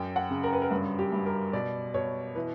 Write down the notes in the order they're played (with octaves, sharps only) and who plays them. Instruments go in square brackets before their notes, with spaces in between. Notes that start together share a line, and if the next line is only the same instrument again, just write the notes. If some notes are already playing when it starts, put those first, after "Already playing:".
Already playing: [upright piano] F#2 G5
F#5
C#3
A#4
B4
A#4
G2
G4
G2
A#4
B2 D5
B2 C#5
E3 B4